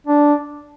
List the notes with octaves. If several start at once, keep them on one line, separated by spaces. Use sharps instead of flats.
D4